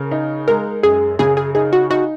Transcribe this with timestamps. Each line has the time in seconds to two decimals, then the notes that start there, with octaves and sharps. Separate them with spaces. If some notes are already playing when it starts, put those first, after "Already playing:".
Already playing: C#3 A#4
0.11 D#4
0.48 G#3 A#4
0.83 F#2 G#4
1.19 C#3 G#4
1.37 G#4
1.55 D#4 G#4
1.73 F#4
1.90 D#4 F#4